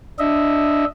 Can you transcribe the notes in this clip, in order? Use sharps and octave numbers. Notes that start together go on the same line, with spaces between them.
D4 D#5 E5